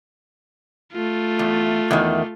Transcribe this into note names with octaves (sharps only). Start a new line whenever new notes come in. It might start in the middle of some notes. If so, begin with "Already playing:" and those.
A3 F4
E2
E2 D#3